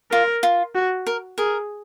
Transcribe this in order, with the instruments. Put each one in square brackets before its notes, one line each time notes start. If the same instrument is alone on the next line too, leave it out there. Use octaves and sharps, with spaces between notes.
[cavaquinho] F4 [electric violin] A#4
[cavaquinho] F4
[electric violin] F#4
[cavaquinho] A#4
[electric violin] G#4 [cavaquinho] A#4